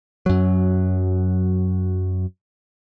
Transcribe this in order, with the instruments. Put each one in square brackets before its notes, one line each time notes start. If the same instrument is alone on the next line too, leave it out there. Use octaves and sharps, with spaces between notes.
[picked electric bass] F#2 F#3